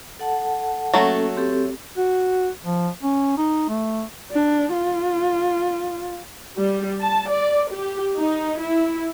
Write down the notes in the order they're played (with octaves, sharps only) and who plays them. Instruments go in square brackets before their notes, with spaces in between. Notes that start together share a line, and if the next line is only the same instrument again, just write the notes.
[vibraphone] A4 F#5 A5
[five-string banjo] F#3 A3 F#4 [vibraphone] A#3 C#4 A4
[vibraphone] C4 G4 A4
[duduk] F#4
F3
C#4
D#4
A3
[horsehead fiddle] D4
F4
[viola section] G3
A5
D5
G4
D#4
E4